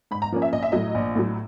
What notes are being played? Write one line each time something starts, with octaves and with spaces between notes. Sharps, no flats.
G#2 B5
A#5
F3 A#3 C#4
E5
A#1 D#5
E5
A2 F#3 D#5
A#1
A2 F#3